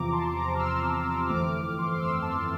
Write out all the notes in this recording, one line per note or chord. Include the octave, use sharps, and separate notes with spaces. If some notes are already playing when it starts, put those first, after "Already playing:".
Already playing: E2 C3 F3 C4 A#5 D6
A5 C6
A#5 D6
F6
C6 E6
G1 F2 E3 A3 C4 D6 F6
C6
D6
C6 E6
A5 C6